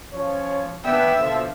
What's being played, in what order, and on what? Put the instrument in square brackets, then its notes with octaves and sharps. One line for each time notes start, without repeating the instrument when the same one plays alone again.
[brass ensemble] F3 C#4 C#5
[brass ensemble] B3 D4 G5 [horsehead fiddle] E5
[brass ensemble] B2 D3 F3